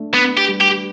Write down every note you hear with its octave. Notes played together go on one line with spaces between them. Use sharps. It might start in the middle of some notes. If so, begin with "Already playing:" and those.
Already playing: A3 D4
B3 B4
G4
G3
G4